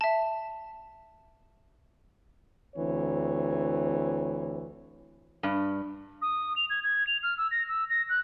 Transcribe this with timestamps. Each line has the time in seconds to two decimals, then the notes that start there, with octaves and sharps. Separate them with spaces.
0.01 E5 A5
2.77 D2 E3 C4 C#5
5.43 G2
6.22 D#6
6.56 F7
6.70 G#6
6.83 G#6
7.07 F7
7.23 F6
7.38 E6
7.51 A#6
7.68 E6
7.90 A#6
8.09 F#6